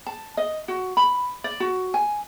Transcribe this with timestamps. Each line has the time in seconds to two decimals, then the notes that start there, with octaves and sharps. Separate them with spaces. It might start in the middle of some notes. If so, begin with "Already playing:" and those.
0.06 A5
0.37 D#5
0.68 F#4
0.97 B5
1.44 D5
1.60 F#4
1.94 G#5